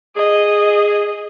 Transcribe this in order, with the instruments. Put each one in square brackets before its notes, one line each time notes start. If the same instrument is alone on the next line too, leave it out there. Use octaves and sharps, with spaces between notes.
[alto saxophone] G#4 [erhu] D#5